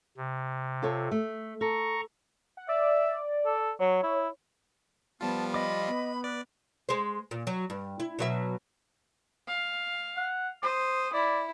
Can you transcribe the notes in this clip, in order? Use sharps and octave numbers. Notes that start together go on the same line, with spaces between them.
C3
F4 A4 C#5
A3
A4 A#5 C#6
F#5
D5 E5
A4
F#3 C#5
E4
F3 G3 B3 F4 A5
D#5 B5 D6
B3
B4 D5
G#3 C5
A#2
F#3
G2
E4
B2 F#3 E5
F5
F#5
C5 D#6
E4 D5